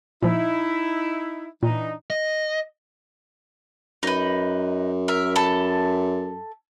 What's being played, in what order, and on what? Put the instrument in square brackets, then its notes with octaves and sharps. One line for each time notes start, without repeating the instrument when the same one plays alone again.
[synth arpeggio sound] A#2 F3 [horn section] D#4 E4
[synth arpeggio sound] A#2 [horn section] E3 D4 D#4
[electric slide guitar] D#5
[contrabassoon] F#2 [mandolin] D#4 B4
[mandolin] A#4 E5
A4 A5 B5